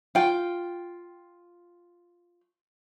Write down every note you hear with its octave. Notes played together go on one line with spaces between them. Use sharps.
F4 G5